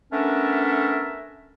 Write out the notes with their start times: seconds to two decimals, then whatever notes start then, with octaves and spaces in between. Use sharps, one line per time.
0.12 A3 B3 C#4 D4 A#4 E5